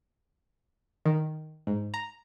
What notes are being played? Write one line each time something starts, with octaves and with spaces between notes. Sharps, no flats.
D#3
G#2
A#5